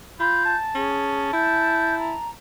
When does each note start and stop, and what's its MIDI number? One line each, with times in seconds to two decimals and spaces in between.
0.20 0.54 65
0.20 0.44 83
0.20 0.56 91
0.45 2.36 81
0.75 1.32 61
0.75 1.32 68
1.33 2.14 64
1.33 1.97 91
1.98 2.30 82